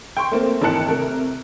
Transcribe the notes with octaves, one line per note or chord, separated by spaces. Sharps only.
G5 C6 C#6
A3 A#3 C4
G#1 E3 A#4 A5 F#6 C#7
C3 A3 A#4